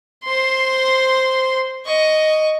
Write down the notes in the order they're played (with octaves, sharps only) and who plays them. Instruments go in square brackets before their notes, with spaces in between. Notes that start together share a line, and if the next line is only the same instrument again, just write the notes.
[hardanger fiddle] C5 C6
D#5 C#6